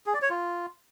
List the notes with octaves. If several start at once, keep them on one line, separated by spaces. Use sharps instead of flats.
G#4
D5
C#5
F4